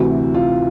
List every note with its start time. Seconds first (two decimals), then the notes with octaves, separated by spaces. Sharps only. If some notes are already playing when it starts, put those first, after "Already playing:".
Already playing: D2 C3 E3 F#4
0.34 F4